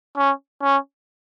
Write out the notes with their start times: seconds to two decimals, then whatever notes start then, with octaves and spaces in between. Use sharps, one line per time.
0.17 C#4
0.63 C#4